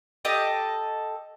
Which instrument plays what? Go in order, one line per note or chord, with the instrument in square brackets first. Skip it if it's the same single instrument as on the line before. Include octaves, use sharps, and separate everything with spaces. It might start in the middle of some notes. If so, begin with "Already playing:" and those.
[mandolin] G4 A4 D#5